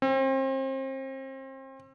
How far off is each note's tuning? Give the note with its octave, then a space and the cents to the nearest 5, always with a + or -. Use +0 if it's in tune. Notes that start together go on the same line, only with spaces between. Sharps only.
C4 +35